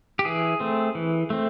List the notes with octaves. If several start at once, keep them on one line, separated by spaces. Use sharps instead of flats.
G4
E3 G#4
A3 C4
E3
A3 C4